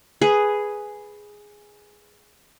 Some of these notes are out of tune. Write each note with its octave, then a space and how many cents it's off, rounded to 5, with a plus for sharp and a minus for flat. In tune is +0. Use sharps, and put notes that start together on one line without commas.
G#4 +0 B4 +0